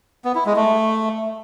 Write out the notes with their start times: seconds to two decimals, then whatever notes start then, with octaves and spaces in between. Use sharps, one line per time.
0.25 B3
0.35 E4
0.46 G#3
0.56 A3